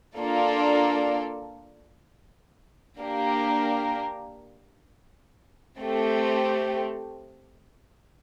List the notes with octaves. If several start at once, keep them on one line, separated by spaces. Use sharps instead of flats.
A#3 D4 F4 A4 D5
A#3 D4 G4 A#4
A3 C4 G4